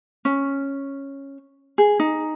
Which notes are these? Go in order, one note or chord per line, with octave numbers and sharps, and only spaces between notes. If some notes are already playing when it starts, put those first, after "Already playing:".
C#4
G#4
D#4